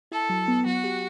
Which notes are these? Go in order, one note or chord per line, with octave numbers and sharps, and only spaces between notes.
E4 A4
F#3
B3
F#3 F#4
G4